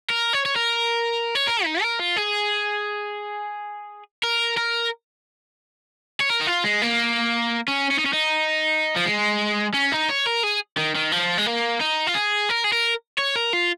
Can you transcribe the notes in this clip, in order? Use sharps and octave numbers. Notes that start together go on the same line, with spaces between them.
A#4
C#5
C#5
A#4
C#5
A#4
D#4
A#4
F4
G#4
A#4
A#4
C#5
A#4
D#4
F4
G#3
A#3
C#4
C#4
D#4
C#4
D#4
F3
G#3
C#4
D#4
C#5
A#4
G#4
D#3
D#3
F3
G#3
A#3
D#4
F4
G#4
A#4
G#4
A#4
C#5
A#4
F4